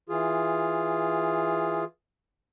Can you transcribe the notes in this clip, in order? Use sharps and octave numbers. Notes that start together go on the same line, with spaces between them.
E3 F4 G#4